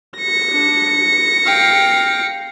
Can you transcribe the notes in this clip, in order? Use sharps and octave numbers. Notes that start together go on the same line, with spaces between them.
A#6 C#7
D4
F5 G5